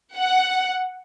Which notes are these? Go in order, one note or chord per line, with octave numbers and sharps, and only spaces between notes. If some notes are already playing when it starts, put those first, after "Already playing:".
F#5